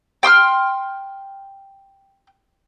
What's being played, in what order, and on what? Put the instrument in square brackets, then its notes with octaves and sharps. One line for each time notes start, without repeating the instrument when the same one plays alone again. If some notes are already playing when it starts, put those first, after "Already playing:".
[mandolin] G5 C6 D#6 F6